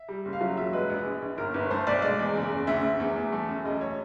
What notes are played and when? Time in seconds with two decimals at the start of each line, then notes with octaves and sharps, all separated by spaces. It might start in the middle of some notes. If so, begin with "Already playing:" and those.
Already playing: E5
0.09 G3
0.25 F#1
0.33 F5
0.41 F#3 E5
0.57 E1 E5
0.73 G#3 B4
0.90 A#1
1.06 A#1
1.22 A#1
1.37 G1 A#4
1.54 G1 B4
1.71 A3 C5
1.87 B1 D5
2.02 G#3 D5
2.19 E2
2.36 F#1
2.51 F#1
2.67 D2 E5
2.83 D2
3.00 E2
3.16 E2
3.32 A3
3.49 F#2
3.65 E1 D#5
3.81 C#5